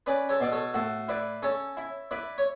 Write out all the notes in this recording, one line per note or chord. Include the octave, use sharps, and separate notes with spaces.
C#4 B4 D5
A4 C#5
B2 D5
A4 C#5
A2 F#4 A4
E4 B4 D5
C#4 A4 C#5
E4
E4 B4 D5
C#5